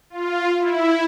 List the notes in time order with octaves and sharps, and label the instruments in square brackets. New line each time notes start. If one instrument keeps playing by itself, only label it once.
[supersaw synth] F4
E4